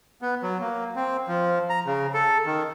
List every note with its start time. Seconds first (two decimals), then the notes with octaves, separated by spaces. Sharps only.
0.22 B3
0.43 F#3
0.60 A#3
0.96 C4
1.28 F3
1.70 A#5
1.86 C#3
2.14 A4
2.46 D#3